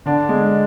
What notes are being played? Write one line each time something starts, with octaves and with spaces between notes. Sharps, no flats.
D3 D4
G#3